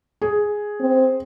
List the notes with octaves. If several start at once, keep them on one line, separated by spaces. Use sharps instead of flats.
G#4
C4